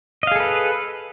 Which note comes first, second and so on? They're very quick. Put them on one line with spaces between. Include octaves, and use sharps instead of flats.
D#5 F5 G#4 A4 B4